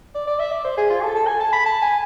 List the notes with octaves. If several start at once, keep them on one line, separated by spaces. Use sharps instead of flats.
D5
D5
E5
D5
C5
G#4
F4
A4
A4
G#5
A5
B5
A5
G#5